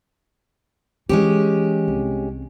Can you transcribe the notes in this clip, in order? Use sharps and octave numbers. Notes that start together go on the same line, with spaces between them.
E3 G#3 C#4 G4
C2